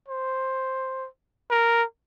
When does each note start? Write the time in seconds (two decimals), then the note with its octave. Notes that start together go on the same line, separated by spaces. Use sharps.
0.08 C5
1.50 A#4